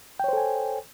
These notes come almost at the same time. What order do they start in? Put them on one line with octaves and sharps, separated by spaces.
G5 C#5 C5 A4 G#5